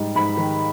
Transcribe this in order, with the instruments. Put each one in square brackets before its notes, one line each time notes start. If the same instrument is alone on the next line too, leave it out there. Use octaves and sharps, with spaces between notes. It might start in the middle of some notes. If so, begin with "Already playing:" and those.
Already playing: [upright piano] G#2 G3
G#2 B5
D#3